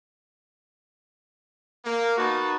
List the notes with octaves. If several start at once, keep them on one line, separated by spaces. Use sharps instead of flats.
A#3
B3 D#4 F#4 B4 A5